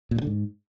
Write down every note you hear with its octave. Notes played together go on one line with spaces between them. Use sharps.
A#2
G2
D3
G#2